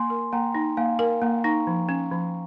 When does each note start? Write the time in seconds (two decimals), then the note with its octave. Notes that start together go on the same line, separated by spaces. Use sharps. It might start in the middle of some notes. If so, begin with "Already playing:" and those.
Already playing: A#3 G#5 C6
0.10 A#4
0.32 A#3 G5 A#5
0.55 D#4
0.77 A#3 F5 G#5
0.99 A#4 F5 G#5
1.22 A#3 G5 A#5
1.44 D#4 A#5 C#6
1.67 F3
1.89 C#4
2.11 F3